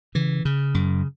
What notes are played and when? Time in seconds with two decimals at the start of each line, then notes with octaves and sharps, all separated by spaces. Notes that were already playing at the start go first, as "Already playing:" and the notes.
0.15 C#3 E3
0.45 C#3
0.74 F#2